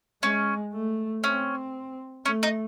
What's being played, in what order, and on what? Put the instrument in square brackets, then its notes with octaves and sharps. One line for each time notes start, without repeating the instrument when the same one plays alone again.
[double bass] G#3 [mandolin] C#4
[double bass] A3
[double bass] C4 [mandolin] C#4
[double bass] A3 [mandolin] C#4
[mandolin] D#4